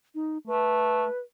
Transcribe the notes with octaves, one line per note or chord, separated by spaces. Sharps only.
D#4
A3 B4